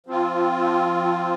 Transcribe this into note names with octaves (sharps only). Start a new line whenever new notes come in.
F3 C4 F4